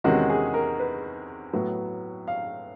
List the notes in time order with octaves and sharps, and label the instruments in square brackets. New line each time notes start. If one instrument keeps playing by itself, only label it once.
[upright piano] E2 C3 D#3 G#3 C#4 F#4
G#4
A#4
B4
A2 F#3 B3
F5